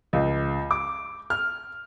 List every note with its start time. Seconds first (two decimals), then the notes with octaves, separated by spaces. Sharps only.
0.13 C#2
0.71 D6
1.30 F6